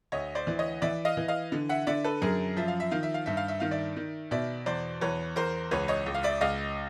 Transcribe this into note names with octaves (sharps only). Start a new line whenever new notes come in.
D2 C#5 D#5
C5 D5
E3 D5
C#5 D#5
E3 D5 E5
D#5 F5
E3
D#5 F5
D3
E5 F#5
D3 D5 E5
A4 B4
F#2 G#4 A#4
F3 E5
F5
E5
D#3 F5
E5
F5
G2 E5
F5
E5
D#3 F5
D5 E5
D#3
B2 D5 E5
E2 C5 D5
E2 B4 C#5
E2 A#4 C5
C#2 B4 C#5
C#5 D#5
C#2
F5
D5 E5
C#2 D#5 F5